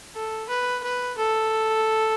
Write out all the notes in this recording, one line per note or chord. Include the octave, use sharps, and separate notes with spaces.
A4
B4
B4
A4